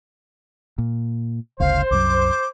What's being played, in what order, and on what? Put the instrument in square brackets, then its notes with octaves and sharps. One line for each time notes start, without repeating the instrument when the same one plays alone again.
[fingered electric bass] A#2
[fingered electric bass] G1 D2 C#3 [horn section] C5 [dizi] F5
[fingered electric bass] C2 F#2 F#3 [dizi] D6